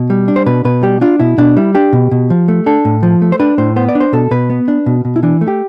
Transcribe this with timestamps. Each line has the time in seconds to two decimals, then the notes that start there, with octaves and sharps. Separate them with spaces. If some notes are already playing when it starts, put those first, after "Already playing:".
Already playing: B2
0.10 G3
0.28 D4
0.36 C5
0.46 B2 B4
0.65 B2 B4
0.83 G3 G4
1.01 D4 F4
1.19 B2 E4
1.38 B2 D4
1.57 G3 E4
1.75 D4 G4
1.93 B2
2.11 B2
2.30 F3
2.48 A3
2.66 D4 A4
2.85 A2
3.03 F3
3.22 A3
3.32 C5
3.40 D4 B4
3.58 A2 C5
3.76 B3 C5
3.89 D5
3.95 D4
4.00 C5
4.13 B2 A4
4.31 B2 B4
4.50 B3
4.68 D4
4.86 B2
5.05 B2
5.16 E4
5.23 E3 D4
5.41 A3
5.48 G4